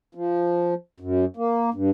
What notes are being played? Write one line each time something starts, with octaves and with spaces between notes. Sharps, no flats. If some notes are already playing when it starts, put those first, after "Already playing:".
F3
F#2
A#3
G2